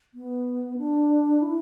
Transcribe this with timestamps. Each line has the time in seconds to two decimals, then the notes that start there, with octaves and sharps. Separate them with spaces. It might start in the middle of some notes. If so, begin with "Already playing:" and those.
0.14 B3
0.78 D4
1.42 E4